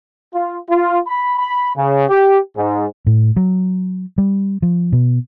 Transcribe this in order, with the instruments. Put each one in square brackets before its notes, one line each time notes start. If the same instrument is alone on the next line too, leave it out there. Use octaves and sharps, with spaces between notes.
[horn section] F4
F4
B5
B5
C#3
G4
G#2
[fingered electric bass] A2
F#3
G3
F3
B2